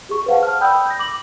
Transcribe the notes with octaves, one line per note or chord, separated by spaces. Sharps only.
G4 G#4 C#6
B4 C5 F5 F#5 A5
A5 F6
D5 G5 B5 D#6 E6 G6
G6 A#6
D6 F#7